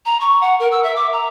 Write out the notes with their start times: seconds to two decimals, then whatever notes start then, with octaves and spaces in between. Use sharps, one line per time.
0.05 A#5
0.20 C#6
0.41 F#5
0.59 A#4
0.71 E6
0.83 E5
0.96 D6
1.12 A#5